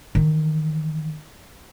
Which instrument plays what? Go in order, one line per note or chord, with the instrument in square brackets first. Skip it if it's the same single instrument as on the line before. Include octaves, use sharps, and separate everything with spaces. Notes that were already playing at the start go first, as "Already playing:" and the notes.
[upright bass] D#3 E3